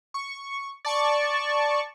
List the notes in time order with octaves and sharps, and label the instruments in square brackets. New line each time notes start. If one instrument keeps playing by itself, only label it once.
[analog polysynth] C#6
D5 A5 C#6